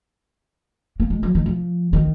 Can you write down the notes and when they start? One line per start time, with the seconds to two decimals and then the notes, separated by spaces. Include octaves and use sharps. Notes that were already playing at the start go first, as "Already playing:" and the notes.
1.00 A#3
1.10 G#3
1.23 F#3
1.35 D#3
1.46 F3
1.93 D#3